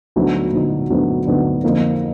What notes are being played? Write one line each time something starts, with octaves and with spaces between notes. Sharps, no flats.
D2 D3 F#3 B3 D#4
D2 D3 F#3 B3 D#4
D2 D3 F#3 B3 D#4
D2 D3 F#3 B3 D#4
F2 D3 F3 A#3 D#4